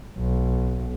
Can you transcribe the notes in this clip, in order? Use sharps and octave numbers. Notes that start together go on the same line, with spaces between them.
B1